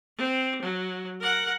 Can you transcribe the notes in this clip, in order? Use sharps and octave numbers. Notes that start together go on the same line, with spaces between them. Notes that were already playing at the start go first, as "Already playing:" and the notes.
C4
F#3
A#4 F#5